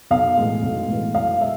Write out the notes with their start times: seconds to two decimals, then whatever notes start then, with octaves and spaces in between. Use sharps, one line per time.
0.11 B1 F5
0.37 A2 E3 G#3
0.63 B1
0.88 A2 E3 G#3
1.15 B1 F5
1.40 G#3 E5